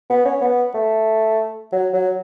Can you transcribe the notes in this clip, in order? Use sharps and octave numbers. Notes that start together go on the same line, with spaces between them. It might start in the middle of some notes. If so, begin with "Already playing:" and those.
B3
C#4
B3
A3
F#3
F#3